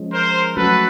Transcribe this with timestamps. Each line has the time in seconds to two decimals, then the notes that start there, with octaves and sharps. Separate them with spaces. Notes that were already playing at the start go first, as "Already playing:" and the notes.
Already playing: F3 G#3 C#4
0.13 A#4 C5
0.56 F#3 A3 C#4 F#4 A4 B4